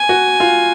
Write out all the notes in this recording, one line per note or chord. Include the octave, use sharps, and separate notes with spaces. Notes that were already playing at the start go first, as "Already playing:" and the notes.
Already playing: G#5
F#4
F4